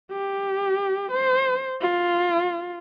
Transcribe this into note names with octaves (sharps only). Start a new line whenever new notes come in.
G4
C5
F4